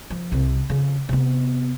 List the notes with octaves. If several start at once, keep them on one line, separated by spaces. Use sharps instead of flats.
F3
C2 C3
F2 C#3
C3 B3